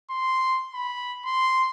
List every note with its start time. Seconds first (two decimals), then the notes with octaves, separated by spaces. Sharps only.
0.10 C6
0.74 B5
1.25 C6